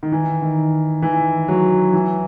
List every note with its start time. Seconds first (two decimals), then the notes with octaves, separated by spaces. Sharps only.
0.03 D#3
0.12 E3
0.42 D#3
1.02 E3
1.48 F#3
1.93 E3